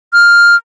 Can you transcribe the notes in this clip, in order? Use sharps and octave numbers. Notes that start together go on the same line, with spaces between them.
F6